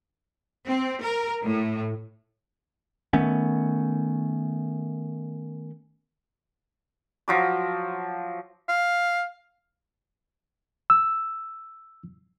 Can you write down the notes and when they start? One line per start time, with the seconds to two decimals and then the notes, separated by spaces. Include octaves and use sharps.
0.68 C4
1.03 A#4
1.44 A2
3.13 D#3 A3 B3 C#4
7.28 F3 F#3 D6
8.69 F5
10.90 E6